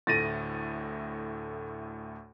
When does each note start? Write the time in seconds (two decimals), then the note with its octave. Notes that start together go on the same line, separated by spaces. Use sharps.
0.07 D2 A2 A3 A6 A#6 D#7